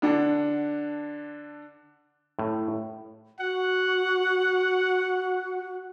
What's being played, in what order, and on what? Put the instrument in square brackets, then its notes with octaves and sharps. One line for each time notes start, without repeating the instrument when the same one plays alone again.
[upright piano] D3 D4 F#5
[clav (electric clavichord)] A2
[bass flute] F#4 [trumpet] F#5